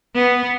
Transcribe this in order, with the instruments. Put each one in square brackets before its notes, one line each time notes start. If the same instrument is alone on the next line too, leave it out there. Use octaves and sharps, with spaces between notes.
[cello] B3